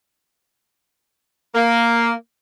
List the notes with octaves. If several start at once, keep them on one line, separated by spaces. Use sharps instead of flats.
A#3